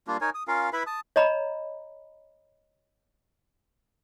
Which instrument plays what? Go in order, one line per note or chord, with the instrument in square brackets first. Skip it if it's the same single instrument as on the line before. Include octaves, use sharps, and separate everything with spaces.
[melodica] G3 A#3 D4 F4
D#4 A#4 C#5 G#5
D#6
C#4 F4 A#4 F5
E4 B4 E5 B5
A5 D#6
[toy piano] C#5 D#5 A#5 B5